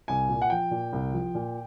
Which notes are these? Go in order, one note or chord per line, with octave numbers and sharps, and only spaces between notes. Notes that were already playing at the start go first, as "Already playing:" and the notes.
C2 G#5
A#2
F#5
F3 G5
A#2
C2
F3
A#2